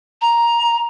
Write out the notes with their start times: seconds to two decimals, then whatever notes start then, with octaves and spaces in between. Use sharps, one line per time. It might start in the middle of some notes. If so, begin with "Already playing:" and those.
0.22 A#5